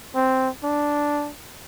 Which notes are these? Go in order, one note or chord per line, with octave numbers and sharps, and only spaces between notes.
C4
D4